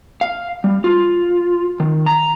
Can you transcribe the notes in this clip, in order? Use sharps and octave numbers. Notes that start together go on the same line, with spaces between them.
F5
G3
F4
D#3
A#5